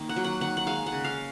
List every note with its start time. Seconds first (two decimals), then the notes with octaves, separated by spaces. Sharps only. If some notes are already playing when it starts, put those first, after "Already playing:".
Already playing: D#3 A#3
0.09 F#5
0.16 F#3
0.24 F#5
0.41 D#3 F#5
0.57 F#5
0.67 G#3 F5
0.86 F#5
0.92 C#3
1.05 F5